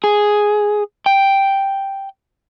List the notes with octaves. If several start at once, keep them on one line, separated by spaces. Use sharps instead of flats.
G#4
G5